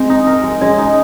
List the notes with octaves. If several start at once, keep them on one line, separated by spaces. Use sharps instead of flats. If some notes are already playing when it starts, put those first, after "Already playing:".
Already playing: G#3 C4
D#4
A#4
G#3
G#3 C#4
D#4